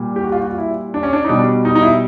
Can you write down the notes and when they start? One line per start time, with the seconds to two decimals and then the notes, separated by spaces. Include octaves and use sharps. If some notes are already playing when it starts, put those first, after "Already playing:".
Already playing: A#2 G3
0.16 G4
0.23 F#4
0.32 F4
0.41 F#4
0.50 F4
0.58 E4
0.94 D4
1.03 C#4
1.13 D4
1.25 D#4
1.29 B2 G3 D4
1.65 D#4
1.75 D#4
1.83 E4